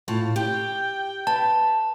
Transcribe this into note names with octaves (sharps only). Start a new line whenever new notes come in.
A2 F4 A5
G4 G5
B4 A5